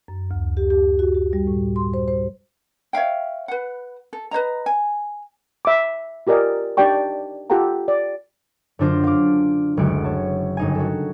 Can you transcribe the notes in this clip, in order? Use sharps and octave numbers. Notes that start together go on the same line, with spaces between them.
F#2
D2
G4
G4
F#4
G4
G3
A2
C6
C5
C5
C#5 E5 F5 G5
B4 F#5
A4
B4 C5 D#5 A#5
G#5
E5 D6
F4 G4 A#4 D5 D#5 G#5
D4 D#4 G4 D5 G5 C#6
F4 G4 A4 F#5 G5 A#5
D5
F#2 D3 D4 F4 C5 A#6
F5 D6
F#1 D2 D3 G#3 F#4 D7
C#5 A5
G1 D#4 G#5
F#4 A4